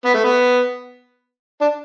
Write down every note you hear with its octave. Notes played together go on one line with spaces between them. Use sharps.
B3
A3
B3
D4